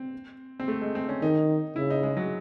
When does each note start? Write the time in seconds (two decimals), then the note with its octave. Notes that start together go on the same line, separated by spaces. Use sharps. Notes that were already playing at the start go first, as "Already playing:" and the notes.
Already playing: C4
0.60 C4
0.68 A3
0.82 G#3
0.95 C4
1.09 C#4
1.22 D#3 D#4
1.76 C#3 E4
1.90 D#4
2.03 G#3
2.17 F#3